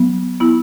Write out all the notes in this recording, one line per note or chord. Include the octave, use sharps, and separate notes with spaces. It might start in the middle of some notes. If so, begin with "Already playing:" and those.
Already playing: F#3 B3
B3 E4